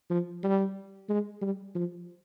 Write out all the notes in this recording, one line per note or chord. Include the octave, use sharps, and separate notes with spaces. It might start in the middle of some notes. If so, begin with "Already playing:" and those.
F3
G3
G#3
G3
F3